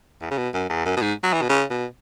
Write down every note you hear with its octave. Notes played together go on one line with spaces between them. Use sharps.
E2
C#3
B2
F#2
E2
F#2
B2
G#2
F#3
E3
B2
C#3
B2